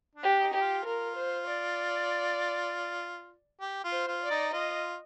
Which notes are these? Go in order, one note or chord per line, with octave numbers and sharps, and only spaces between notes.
D4
G4
D#4
G4
F4
F4 A#4
C5
D5
G4
F4
C5
F4
D5
D#4
F4 D#5